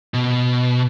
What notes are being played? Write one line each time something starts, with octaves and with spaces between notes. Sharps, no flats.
B2